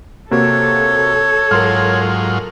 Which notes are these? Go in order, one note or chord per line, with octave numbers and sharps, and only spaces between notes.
C3 A#3 F#4 A4 C#5
G#2 F#3 F4 A#4 C6 F6